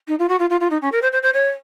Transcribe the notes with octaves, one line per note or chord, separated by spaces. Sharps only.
D#4
F4
F#4
F4
F4
F4
D#4
C#4
A#4
C5
C5
C5
C#5